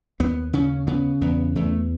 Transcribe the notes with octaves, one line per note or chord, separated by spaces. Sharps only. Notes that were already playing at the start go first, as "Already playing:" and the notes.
D#2 B3
C#3 C#4
C#3 B3
E2 B3
E2 A3